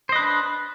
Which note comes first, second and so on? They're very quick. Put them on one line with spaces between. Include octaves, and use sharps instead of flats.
C5 D#5 B4 D4